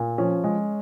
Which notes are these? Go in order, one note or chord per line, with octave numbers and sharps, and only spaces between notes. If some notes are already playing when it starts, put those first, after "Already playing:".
Already playing: A#2
F3 C#4
G#3